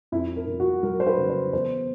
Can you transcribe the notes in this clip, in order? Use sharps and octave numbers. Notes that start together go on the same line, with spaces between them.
F2 E4
A#4
F2
F#4
F#3 A#4
C5
B4
C#3
C5
E2 C5